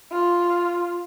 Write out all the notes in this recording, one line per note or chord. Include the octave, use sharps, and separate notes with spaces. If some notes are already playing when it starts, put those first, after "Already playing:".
F4